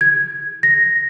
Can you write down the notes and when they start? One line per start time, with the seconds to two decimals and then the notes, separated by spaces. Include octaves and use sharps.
0.01 G#6
0.63 A#6